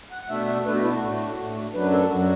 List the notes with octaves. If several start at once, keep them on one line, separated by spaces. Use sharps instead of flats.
F#5
F#5
B2 A3 D4 E5
E5
B2 A3 D4 B4
F#4
E4
F#4
A2 A3 D4
A2 A3 D4
F#2 F#3 D4 B4
A4
F#2 F#3 D4 F#4